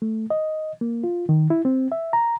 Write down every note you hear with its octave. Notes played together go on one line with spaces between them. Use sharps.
A3
D#5
A#3
F4
D#3
E4
C4
E5
A#5